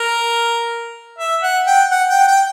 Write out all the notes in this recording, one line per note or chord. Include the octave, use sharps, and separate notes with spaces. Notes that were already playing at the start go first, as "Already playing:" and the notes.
Already playing: A#4
E5
F#5
G5
F#5
G5
G5